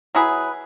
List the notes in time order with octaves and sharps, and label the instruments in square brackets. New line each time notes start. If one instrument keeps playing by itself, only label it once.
[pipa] F#3 E4 G#4 B4